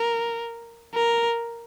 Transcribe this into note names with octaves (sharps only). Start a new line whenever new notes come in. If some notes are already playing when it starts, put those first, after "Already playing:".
Already playing: A#4
A#4